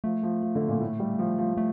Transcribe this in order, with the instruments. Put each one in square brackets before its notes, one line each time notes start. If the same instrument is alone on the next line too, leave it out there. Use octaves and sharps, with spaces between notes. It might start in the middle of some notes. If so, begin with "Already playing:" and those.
[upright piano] F3 [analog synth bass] A3
[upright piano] F3
F3
D3
A#2
A2
G3
F3
F3
[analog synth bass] A3